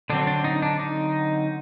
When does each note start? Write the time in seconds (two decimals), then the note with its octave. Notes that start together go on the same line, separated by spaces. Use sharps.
0.10 D3 F#3 C4 D4
0.27 D4
0.44 D#4
0.62 D4
0.80 D#4